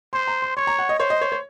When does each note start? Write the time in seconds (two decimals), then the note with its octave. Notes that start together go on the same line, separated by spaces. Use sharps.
0.13 C5 C6
0.27 A#5
0.42 C6
0.57 C#5 C6
0.67 A#5
0.79 F#5
0.89 D#5
0.99 C5 C#5
1.10 D#5
1.21 C#5
1.32 C#5